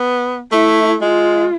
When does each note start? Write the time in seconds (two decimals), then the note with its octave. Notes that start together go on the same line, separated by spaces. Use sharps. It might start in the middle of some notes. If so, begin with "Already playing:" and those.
Already playing: B3
0.52 A3 E4
1.01 G#3 F4